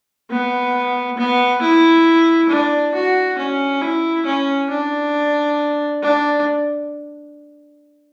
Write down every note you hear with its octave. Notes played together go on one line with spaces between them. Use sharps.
B3
B3
E4
D4
F#4
C#4
E4
C#4
D4
D4